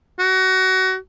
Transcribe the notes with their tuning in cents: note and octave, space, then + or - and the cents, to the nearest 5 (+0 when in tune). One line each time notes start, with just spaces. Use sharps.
F#4 +25